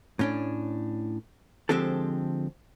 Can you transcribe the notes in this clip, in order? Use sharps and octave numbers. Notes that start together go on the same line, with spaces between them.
A2 C#4 D4
D3 F3 G#3 C4 G4 A4